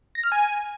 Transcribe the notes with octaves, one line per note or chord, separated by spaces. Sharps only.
A#6
F6
G#5